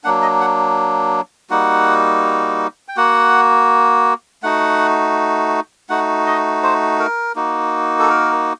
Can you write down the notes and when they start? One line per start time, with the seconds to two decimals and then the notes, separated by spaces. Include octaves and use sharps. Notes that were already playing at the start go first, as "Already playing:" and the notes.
0.04 F#3 A#3 D4 F#5
0.22 D#5
0.41 F#5
1.50 G3 A#3 D#4 F#4 F#5
2.88 G5
2.97 A#3 F#4 F#5
4.43 A3 D#4 F#4 F#5
5.89 A3 D#4 F#4 F#5
6.26 D#5
6.63 C5
6.99 A#4
7.36 A#3 D#4 F#4
7.99 A4
8.09 A#4